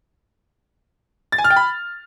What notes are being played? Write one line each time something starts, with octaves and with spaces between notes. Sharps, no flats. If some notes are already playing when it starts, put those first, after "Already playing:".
A6
G#5
F6
G5
B5